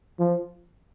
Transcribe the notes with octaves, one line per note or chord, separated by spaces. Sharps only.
F3